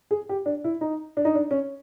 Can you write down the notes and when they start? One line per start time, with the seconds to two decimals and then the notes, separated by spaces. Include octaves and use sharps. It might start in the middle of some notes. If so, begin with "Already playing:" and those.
0.11 G#4
0.29 G4
0.46 D4
0.64 E4
0.81 D#4
1.17 D4
1.25 D#4
1.35 D4
1.51 C#4